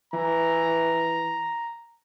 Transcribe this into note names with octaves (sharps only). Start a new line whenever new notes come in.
E3 A#5